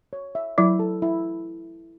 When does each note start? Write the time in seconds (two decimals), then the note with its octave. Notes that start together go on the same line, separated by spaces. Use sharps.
0.13 C#5
0.35 E5
0.58 F#3 E4
0.79 A4
1.02 E4